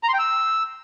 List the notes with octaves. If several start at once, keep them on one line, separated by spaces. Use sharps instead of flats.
A#5
C6
G5
E6